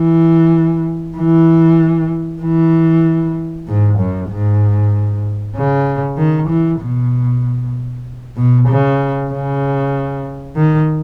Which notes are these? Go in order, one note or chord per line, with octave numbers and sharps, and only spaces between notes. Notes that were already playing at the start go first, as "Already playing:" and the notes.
Already playing: E3
E3
E3
G#2
F#2
G#2
C#3
D#3
E3
B2
B2
C#3
C#3
D#3